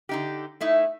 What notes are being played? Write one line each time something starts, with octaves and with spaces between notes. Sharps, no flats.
D3 D#4 G4
A3 D#4 E4